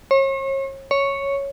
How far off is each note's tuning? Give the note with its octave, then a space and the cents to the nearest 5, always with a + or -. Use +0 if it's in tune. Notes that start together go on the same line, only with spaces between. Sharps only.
C#5 -40
C#5 +0